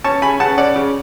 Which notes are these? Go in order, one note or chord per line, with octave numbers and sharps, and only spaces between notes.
C#4 A5 C#6
C#3 G#5 B5
C#3 F#5 A5
C#4 D5 F#5
C#3